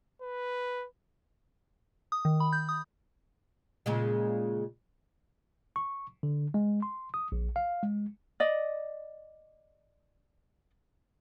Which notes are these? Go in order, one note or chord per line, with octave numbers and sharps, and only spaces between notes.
B4
D#6
D#3
B5
G6
D#6
A#2 C#3 G#3
C#6
D3
G#3
C6
D#6
A#1
F5
G#3
D5 D#5